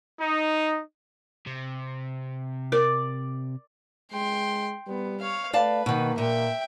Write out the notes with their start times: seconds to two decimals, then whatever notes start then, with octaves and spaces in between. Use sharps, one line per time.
0.21 D#4
1.47 C3
2.72 A#4 D5
4.12 G#3 G5 C6
4.88 G3 B3
5.20 C#5 F5
5.53 A3 B4 D5 F5 A5
5.86 B2 D#3 A#3
6.18 A#2 E5 G5